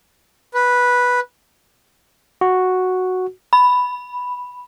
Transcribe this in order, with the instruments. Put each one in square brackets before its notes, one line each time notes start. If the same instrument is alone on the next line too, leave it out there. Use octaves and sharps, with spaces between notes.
[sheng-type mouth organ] B4
[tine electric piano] F#4
[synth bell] B5